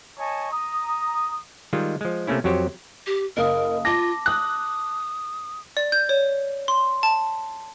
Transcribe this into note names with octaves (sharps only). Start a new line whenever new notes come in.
C#5 D#5 G#5 A5 C#6
A#5 D#6
D#3 G3 G#3 F4
F3 G#3
C3 A3 A#3 C#4 E4
F2 F#3 F#4 G4 C5 C#5
G4
F#1 A#4 D#5 F5 D#6
F4 A5 D6 A#6
D#6 F#6
D5
G6
C#5
C6
A5